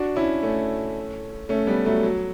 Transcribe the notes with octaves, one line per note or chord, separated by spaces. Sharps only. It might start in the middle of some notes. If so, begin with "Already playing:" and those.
Already playing: D4 F#4
C#4 E4
A3 C#4
A3 C#4
G3 B3
F#3 A3
F#3